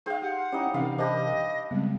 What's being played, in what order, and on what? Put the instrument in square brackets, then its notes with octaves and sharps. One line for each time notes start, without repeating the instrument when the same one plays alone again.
[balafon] D#4 G#4 G5 [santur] C5 F5
[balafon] G4 [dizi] F#5
[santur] G3 D#4 [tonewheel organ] C#4 E4 C#5
[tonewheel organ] C3 E3 A#4 [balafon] C4 C#4 D#4 [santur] F5
[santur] D4 G4 B5 [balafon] C5 [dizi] D#5
[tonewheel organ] C#3 G#3 B3 [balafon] G3 C4